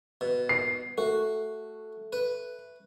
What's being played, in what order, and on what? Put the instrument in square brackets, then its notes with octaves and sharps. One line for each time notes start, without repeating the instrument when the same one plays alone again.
[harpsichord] B2
[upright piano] C7
[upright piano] A3 [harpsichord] F#4
[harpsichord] B4